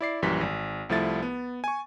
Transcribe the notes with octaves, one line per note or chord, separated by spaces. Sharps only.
E4 D5 C7
A#1 F#2 E3 G3 B6
G#1
C2 F3 A3 E4 A6
B3
G#5 C#6